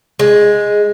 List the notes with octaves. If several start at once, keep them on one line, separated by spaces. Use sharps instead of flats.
G#3